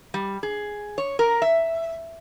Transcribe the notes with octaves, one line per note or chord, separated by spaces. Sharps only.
G3
G#4
C#5
A#4
E5